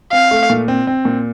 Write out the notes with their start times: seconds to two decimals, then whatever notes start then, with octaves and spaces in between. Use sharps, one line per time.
0.12 C4 F5
0.31 A3
0.50 A#2
0.68 C4
0.87 C4
1.05 A#2